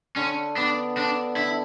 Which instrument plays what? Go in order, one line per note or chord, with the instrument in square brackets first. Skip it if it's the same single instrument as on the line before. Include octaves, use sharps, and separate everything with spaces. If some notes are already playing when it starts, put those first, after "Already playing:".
[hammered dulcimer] D3 [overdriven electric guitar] C#4
[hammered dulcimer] B3 [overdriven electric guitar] D4
[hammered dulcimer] D3 [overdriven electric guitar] D4
[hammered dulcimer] D3 [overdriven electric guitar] E4